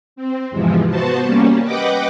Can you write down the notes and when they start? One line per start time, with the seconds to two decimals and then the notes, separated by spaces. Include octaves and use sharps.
0.16 C4
0.51 E2 G#2 C3 E3 F3
0.89 B3 F#4 C5 A5
1.22 G3 A#3 C#4
1.64 B4 D#5 F#5 G5 D6